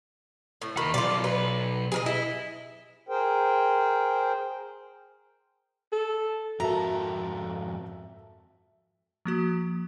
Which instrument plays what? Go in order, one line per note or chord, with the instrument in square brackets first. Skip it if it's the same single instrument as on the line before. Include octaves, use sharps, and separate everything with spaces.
[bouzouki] A2
[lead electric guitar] D#2 B5 [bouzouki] D#3
[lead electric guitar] B1 [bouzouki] F4 D5
[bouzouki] B4
G#4 A#4 D#5
[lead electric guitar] E4 [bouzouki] D#5
[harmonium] G#4 A#4 C5 G5
[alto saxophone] A4
[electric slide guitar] F2 G#2 A4 [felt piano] F#4 A#4 [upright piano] E5 A5 [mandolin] A#5
[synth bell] F3 A#3 F#4